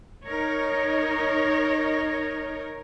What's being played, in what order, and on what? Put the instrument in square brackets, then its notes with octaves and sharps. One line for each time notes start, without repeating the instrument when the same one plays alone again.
[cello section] D#4 A#4 C#5